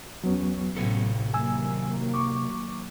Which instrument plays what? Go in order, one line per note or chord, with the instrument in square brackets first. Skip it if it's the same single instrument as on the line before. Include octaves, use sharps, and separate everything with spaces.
[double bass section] E2 C#4 [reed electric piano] F#3 B3
[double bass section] A1 [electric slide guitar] C3 A4
[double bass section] D#3 F#3 A#3 [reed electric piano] G#5 E6
[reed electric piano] C#6 D6